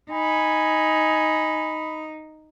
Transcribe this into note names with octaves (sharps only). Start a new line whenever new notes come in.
D#4 G#5 B5